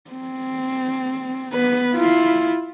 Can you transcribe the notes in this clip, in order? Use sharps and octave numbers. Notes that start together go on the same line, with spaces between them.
C4
B3 B4
E4 F4